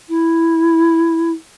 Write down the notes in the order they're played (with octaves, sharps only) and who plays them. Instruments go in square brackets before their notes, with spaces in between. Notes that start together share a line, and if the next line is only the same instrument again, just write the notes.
[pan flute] E4